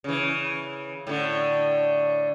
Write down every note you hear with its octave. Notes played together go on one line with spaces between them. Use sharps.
C#3 E3
A2 D3